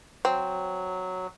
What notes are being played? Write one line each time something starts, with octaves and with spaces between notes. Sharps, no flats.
F#3 C4